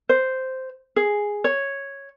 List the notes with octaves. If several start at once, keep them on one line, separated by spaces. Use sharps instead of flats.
C5
G#4
C#5